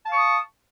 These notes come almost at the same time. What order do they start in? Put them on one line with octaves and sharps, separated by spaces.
A5 F5 C#6 D#6